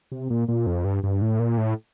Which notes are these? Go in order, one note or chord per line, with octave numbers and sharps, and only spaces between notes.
C3
A#2
A#2
F2
G2
G2
A2
A#2
A2